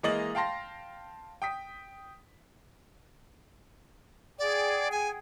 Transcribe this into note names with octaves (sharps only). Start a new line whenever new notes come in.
E3 G#3 A#3 D#5 A6 F#7
F5 G5 A5 C6 A#6
G5 D#6 B6
G#4 D5 F#5 G5
G#5